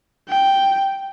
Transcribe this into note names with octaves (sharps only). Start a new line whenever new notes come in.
G5